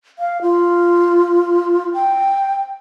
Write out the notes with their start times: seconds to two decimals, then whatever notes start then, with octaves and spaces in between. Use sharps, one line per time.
0.19 F5
0.42 F4
1.94 G5